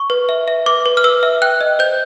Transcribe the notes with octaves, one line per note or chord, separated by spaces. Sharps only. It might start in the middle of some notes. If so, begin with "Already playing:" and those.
Already playing: C#6
B4
E5
E5
B4 D6
B4
F6
B4 E6
E5
G5 F#6
D#5
C5 G6